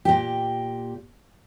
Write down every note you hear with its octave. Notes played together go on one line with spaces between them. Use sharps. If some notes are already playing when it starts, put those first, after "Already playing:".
A#2 G4